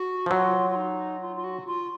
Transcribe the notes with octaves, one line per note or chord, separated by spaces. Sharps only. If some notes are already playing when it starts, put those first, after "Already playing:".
Already playing: F#4
F3
F#3 F4
F4
D#4
F4
F4
F#4
F4